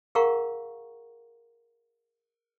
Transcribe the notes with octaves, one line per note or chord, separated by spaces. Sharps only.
G#4 A#4 F5 F#5 A#5 C#6